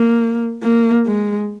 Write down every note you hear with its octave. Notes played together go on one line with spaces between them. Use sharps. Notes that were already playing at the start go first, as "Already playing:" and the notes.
Already playing: A#3
A#3
G#3